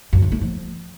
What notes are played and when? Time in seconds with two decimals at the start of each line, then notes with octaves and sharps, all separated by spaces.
0.13 F#2
0.22 C#3
0.32 A3
0.41 F3